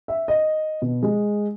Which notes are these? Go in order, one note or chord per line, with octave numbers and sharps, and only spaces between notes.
E5
D#5
B2
G#3